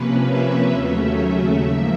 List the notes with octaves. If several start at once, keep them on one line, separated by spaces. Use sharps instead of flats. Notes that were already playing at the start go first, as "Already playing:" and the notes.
Already playing: C3 F3 A#3 C#4 B4
E5
D#2 C#3 F#3 A3 C#4 E5
G#2 F3 A#3